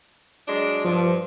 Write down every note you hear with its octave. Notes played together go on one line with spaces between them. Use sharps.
F#3 G#3 D4
G2 F3